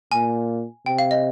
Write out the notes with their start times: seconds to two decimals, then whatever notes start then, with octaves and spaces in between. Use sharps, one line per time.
0.12 A#2 G#5
0.86 C3 G5
0.99 F5
1.11 D#5